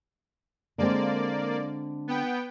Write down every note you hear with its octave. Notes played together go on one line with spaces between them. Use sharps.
D3 G#3 A#3 C4 D5
B3 G5